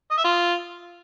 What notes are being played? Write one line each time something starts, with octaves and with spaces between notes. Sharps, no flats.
D#5
E5
F4